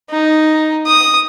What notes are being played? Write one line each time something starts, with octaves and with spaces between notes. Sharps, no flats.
D#4
D#6